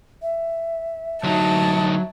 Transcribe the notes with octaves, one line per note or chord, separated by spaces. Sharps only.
E5
D2 F#3 D#4 A5